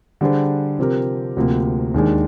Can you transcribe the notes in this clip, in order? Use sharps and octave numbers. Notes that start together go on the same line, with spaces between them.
D3 G3 D4 G#4 C5
C3 F3 C4 G4 A#4
D2 C3 F3 A#3
D#2 D#3 G#3 D4 G#4